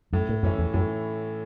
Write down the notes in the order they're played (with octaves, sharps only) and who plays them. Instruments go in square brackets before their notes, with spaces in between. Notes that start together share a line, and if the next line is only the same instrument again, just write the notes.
[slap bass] F#2 [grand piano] A2
[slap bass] A2
[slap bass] F#2 [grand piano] E3 C#4 E4
[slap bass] E2
[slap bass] F#2 [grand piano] A2